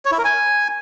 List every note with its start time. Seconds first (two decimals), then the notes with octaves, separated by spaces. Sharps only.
0.05 C#5
0.12 E4
0.18 A#4
0.25 G#5